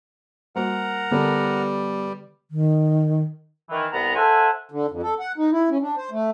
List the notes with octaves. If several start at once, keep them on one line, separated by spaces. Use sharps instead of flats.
G3 A#3 F#4 A#4 C5 F#5 A#5
D3 G3 B3 A4 B4
D#3
D#3 E3
C2 B3 A#5
A4 C5 E5 F#5 G#5
D3
F2
A4
F#5
D#4
E4
C#4
D4
C5
A3